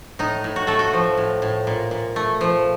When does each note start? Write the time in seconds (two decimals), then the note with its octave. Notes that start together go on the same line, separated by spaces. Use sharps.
0.19 A2 D#4
0.44 A2
0.56 F#4
0.67 A3 A4
0.79 F#4
0.93 F3
1.17 A2
1.42 A2
1.67 A#2
1.91 A#2
2.16 A3
2.41 F3